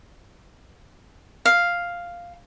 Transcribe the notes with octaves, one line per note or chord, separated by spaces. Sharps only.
F5